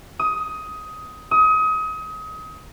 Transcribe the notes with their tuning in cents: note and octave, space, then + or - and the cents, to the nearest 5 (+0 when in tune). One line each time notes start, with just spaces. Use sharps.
D#6 +15
D#6 +30